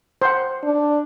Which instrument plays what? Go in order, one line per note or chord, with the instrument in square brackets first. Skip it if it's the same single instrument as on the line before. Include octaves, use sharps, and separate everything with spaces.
[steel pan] C5 F#5
[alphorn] D4